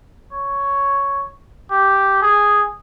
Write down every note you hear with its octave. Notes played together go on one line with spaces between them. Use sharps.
C#5
G4
G#4